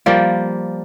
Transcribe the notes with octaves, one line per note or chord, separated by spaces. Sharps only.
F3 G3 A#3